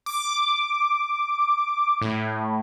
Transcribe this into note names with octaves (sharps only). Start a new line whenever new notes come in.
D6
A2